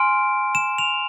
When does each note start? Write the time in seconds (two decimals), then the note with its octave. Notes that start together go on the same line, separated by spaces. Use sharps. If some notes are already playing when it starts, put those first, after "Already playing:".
Already playing: G#5 C6 F6 D7
0.55 E7
0.78 F7